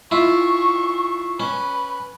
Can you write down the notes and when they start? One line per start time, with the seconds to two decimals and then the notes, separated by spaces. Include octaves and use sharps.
0.11 E4 F4 C#6
1.40 C#4 B4